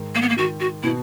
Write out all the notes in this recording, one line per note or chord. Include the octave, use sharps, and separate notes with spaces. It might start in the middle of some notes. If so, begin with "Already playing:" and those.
Already playing: G#2 D#3
A#3
B3
A#3
D#3 F#4
F#4
B2 E4